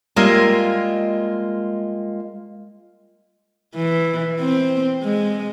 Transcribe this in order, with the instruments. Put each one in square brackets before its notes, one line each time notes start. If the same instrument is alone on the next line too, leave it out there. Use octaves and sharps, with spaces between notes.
[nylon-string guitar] G3 G#3 A#3 F4 D#5 E5
[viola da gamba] E3
C4
G#3